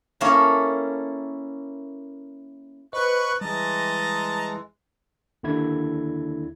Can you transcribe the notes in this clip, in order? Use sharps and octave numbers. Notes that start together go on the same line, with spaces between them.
A#3 C#4 E4 A4 A#4
B4 C5 D#5 C#6 F#6
E3 G3 G#3 D#5 A5 A#5
D#2 D3 E4 G#6